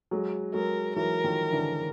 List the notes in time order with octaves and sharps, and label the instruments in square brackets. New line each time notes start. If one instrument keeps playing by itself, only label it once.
[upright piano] F#3 G#3
[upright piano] F#3 G#3 [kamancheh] A#4
[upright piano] E3 F#3 [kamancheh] A#4
[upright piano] D#3 F3
D3 E3